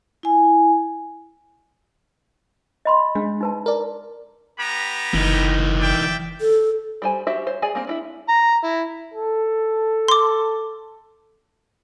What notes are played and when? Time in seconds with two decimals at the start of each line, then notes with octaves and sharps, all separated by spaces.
0.23 E4 G#5
2.85 D#5 B5 C6
3.15 G#3 D4
3.41 D#4 B4 A5
3.66 A#4 D5
4.59 B3 G4 A#5
5.14 F#1 E3 D#4
5.80 D5 E5 G5
6.41 A4
7.02 G3 C5 G#5
7.27 F#4 G4 C5 E5
7.47 C5 C#5
7.62 G#4 D5 G#5
7.75 A#3 C4
7.87 D4 E4 E5
8.29 A#5
8.64 E4
9.14 A4
10.08 C6 D6